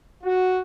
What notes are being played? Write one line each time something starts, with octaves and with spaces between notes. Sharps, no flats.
F#4